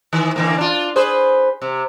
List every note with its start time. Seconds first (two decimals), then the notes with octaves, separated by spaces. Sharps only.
0.13 D#3 E3
0.36 D3 E3 A#3
0.58 D4 F4
0.96 G#4 B4 C5
1.62 C3